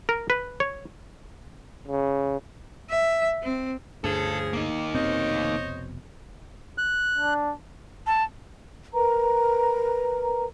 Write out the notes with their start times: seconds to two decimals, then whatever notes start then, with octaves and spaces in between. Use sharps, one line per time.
0.09 A#4
0.30 B4
0.60 C#5
1.88 C#3
2.90 E5
3.43 C4
4.04 D2 G2 C#3 F3 D4 G#4 A4
4.53 A#3 D#4
4.94 F1 B2 C4 C5 C#5 D#5
6.78 F#6
7.18 D4
8.07 A5
8.94 A#4 B4 A#5